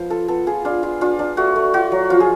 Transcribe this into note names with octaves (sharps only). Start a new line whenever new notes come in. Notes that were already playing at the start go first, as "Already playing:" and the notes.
Already playing: F3 B3
F4 A4
B3 A4
F4 G#4
D4 F4
F4
D4 F4
D4
A3 F#4
A3
F4 F#4
F#3
F3 F4
G#4